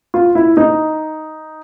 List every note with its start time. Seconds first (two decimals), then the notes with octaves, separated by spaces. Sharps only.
0.14 F4
0.35 E4
0.57 D#4